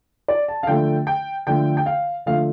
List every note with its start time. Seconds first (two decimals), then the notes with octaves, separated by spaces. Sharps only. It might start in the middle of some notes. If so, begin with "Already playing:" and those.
0.28 D5
0.48 A5
0.63 F5
0.67 D3 F3 A3 G5
1.07 G5
1.47 D3 F3 A3 G5
1.77 G5
1.86 F5
2.26 D3 F3 A3 F5